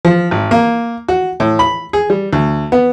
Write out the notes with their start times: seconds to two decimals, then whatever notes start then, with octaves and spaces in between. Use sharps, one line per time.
0.05 F3
0.31 G#1
0.51 A#3
1.08 F#4
1.40 A2
1.59 B5
1.93 G#4
2.10 G3
2.33 D2
2.72 B3